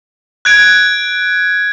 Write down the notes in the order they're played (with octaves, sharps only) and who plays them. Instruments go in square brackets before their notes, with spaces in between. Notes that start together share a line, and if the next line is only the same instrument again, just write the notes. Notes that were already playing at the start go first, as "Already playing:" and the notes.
[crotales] F#6 G#6 D7